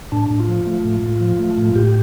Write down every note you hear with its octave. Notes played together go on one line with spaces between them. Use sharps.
A2 D4
A2
F4
F3
A3
A2
A2
F3
A3
A2
A2 G4